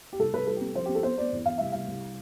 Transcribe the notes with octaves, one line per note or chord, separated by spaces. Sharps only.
G4
C2 A4
C2 B4
G3 A4
G4
C4
F3 C5
G4
C4
A4
B3 C5
B3 D5
E2
E2 F5
C2 E5
C2 F5
C2